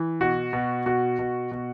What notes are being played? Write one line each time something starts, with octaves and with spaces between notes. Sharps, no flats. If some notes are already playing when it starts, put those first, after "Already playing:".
Already playing: E3
B2 F#4
B2
B2 F#4
B2
B2